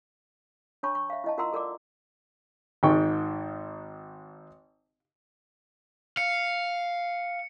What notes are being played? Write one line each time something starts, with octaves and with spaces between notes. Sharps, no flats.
D4 C#5 A5 B5 C#6
C#6
E5 F5
E4 D#5 A5
F4 A#4 F#5 A#5 C6 E6
A4 A#4 D5 D6
G#1 G#2 G5 C#6
F5 C#7